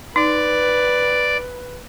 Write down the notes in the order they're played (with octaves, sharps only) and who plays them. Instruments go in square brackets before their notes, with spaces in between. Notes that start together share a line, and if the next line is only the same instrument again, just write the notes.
[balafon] D#4 [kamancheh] B4 [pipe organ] D5